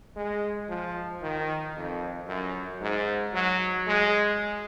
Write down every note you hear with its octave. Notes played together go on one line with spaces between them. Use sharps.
G#3
F3
D#3
F2
F#2
G#2
F#3
G#3